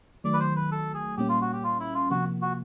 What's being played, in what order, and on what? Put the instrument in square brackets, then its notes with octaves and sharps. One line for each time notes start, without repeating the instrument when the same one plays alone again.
[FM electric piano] D#3 F#3 A3 [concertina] D5
[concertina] B4
C5
B4
A4
G#4
[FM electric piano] A#2 G3 A#3 C#4 [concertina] G4
[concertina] F4
F#4
G4
F4
E4
F4
[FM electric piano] C3 F3 A#3 [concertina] F#4
[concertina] F#4